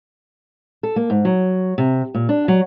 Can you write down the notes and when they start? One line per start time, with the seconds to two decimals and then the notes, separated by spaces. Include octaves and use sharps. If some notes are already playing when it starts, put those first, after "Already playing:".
0.83 A4
0.96 A#3
1.10 G#2
1.25 F#3
1.78 C3
2.14 A#2
2.29 D4
2.48 F#3